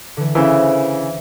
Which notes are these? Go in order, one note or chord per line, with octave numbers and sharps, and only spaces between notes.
D3 E3
C#3 E3 C5 E5